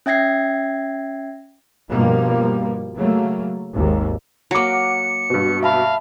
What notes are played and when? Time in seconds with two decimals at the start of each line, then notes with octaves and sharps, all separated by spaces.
0.06 C#4 E5 G5 G#6 A#6 C7
1.90 G2 B2 F3 G3 A#3
2.95 C#3 F#3 A3 A#3
3.71 G#1 D#2
4.51 F#3 A#3 F#5 D6 C#7
5.30 G2 B2
5.63 E5 F5 A5 B5